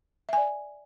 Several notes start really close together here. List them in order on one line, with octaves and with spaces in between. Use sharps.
E5 G#5 D5